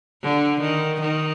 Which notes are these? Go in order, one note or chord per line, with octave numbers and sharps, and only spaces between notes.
D3
D#3
D#3